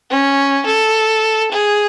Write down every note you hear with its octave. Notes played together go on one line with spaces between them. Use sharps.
C#4
A4
G#4